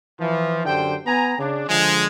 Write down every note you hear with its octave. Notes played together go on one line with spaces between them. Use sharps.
E3 F3
F#2 D3 G4 C5 G5
B3 G#5 A#5
C#3 D4
D3 F3 G#3